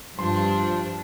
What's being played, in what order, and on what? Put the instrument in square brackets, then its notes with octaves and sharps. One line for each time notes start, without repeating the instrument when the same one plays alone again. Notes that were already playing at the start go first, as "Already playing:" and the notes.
[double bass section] G2 [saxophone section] F3 [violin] D4 [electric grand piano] C6